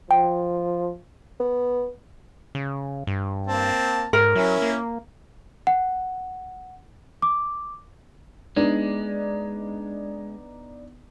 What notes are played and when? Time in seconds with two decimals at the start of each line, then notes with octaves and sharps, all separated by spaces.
0.11 F3 G5
1.40 B3
2.55 C#3
3.07 G2
3.47 A#3 C4 A5
4.13 G#2 A#4
4.35 F#3 C#4 E4
4.62 A#3
5.67 F#5
7.22 D6
8.56 G#3 B3 D4 D#4